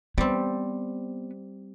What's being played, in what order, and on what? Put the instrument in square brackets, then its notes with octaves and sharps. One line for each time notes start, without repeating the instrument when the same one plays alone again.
[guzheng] G3 C4 [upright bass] B3